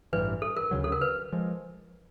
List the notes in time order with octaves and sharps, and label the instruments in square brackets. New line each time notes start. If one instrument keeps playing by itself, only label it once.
[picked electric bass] A1 G2 E3 [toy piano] B4
[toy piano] A4
A#4
[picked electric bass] D2 C#3 F#3
[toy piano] A4
A#4
B4
[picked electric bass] F3 G#3